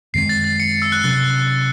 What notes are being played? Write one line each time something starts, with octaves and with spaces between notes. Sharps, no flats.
F#2 D#3 G#3 C4 C7
A6
A6
C#7
E6
F#6
C3 F#3 C#4 A6